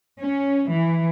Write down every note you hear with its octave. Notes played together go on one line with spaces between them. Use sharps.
C#4
E3